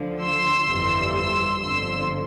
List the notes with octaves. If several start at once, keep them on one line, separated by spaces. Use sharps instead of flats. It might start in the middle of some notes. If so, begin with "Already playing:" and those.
Already playing: D2 D3 F3
C6 E6
G1 F2 E3 G3
C6 E6
G1 F2 D3 F3 C6 E6